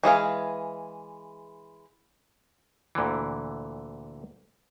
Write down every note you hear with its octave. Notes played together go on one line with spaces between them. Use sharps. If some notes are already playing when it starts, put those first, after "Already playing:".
E3 G#3 G#4 F5
D2 A#2 D3 E3